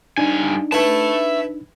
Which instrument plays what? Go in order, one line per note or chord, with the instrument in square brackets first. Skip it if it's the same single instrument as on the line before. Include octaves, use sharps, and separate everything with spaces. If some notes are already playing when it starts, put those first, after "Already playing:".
[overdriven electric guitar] G2 G#5 [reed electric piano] D4 D#4
[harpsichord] E4 B4 [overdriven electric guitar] E5 A5